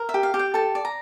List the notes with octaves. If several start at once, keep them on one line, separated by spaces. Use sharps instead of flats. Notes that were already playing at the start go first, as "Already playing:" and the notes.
Already playing: A#4
E5
G4
F5
G4
G5
A4 A5
D5
A#5